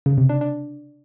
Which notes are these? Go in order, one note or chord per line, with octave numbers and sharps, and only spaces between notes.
C#3
C3
D4
D4